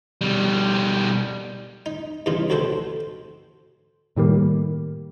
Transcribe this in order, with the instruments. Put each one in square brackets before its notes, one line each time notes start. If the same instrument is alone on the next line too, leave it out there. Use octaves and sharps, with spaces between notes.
[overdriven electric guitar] B2 G3
[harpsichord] D#4
G2 C#3 E3 D#4 F4
D2 B2 F#3 A4 G5 C6
[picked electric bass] A2 D#3 G3 A#3